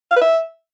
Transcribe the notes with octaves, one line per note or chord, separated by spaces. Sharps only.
F5
B4
E5